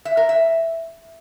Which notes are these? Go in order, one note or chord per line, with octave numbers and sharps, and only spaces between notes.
E5
A#4
E5